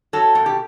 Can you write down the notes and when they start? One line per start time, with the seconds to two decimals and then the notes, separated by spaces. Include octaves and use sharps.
0.13 F#3 A4
0.35 B2
0.46 G4